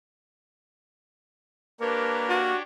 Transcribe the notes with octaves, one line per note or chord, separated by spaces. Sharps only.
A#3 D4 G4 A#4 B4 C#5 A5 A#5
F#4